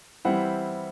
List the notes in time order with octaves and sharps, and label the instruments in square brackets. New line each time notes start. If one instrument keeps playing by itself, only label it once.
[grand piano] E3 G3 C4 E4 F#5